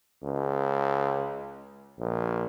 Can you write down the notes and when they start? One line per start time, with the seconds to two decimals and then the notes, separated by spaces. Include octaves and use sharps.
0.24 C#2
1.99 A#1